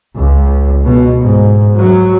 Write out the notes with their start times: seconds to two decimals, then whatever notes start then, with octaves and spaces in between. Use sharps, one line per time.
0.16 C#2
0.85 B2
1.20 G#2
1.77 F#3